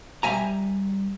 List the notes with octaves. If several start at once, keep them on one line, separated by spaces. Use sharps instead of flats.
G3 E5 G#5 A#5